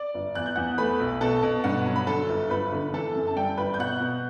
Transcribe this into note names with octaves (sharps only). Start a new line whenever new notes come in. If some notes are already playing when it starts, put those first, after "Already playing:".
Already playing: D5 D6
G1
E2 F#6
G6
E2 F#5 F#6
A3 B4 B5
B1
B2 A4 A5
B2
G2 F#5
F#3
B5
D3 A4 A5
G1
G1 B4 B5
D3
E3 A4 A5
F#2
A5
G3 G5
G1 B4 B5
G6
B2 F#5 F#6
B2